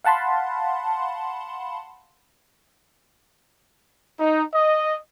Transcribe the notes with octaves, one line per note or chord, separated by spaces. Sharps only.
F5 F#5 A5 B5 C6
D#4
D#5